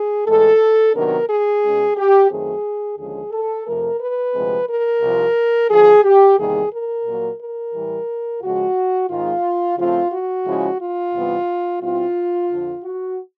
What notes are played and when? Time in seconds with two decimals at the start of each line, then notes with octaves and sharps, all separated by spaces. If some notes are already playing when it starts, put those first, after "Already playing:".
Already playing: G#4
0.26 A2 E3 G#3 A4
0.94 C3 D#3 F#3 B3 D4 A#4
1.29 G#4
1.63 B2 G#3 C#4
1.96 G4
2.29 F#2 D#3 F#3 A3 C4 G#4
2.98 D#2 D3 F3 G#3 C#4 G#4
3.31 A4
3.66 F2 C3 F3 A3 A#4
4.00 B4
4.34 D2 C3 F3 G#3 C4
4.68 A#4
5.01 C2 C3 F3
5.70 D#2 D3 F3 G#4
6.04 G4
6.38 E2 C3 D#3 G3 A#3 G#4
6.72 A#4
7.06 A#2 F#3 A#3
7.40 A#4
7.74 A2 E3 G3
8.42 C#2 C#3 F3 G#3 F#4
9.09 G#2 D#3 G#3 C4 D#4 F4
9.77 C#3 F3 A3 C4 F4
10.11 F#4
10.45 C#3 F3 G#3 C#4 E4
10.79 F4
11.13 E2 C3 E3 G3 B3
11.81 B2 G3 C4 E4 F4
12.49 F2 D3 F3
12.83 F#4